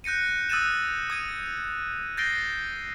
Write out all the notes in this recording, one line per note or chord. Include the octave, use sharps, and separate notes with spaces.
F#6 G6 A#6 C#7 D#7
D#6 E6 F#6 A6 D#7 E7
D#6 G#6 D#7
G6 A6 A#6 C7 D7 G7